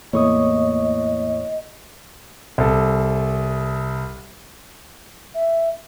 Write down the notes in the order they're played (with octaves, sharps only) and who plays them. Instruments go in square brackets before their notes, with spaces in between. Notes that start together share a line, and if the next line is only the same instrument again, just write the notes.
[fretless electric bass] E2 A2 [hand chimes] A#3 [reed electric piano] C#5 C#6 D#6 [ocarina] D#5
[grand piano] C2 A4
[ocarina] E5